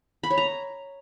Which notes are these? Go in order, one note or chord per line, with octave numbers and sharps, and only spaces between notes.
B5
C#5
A#5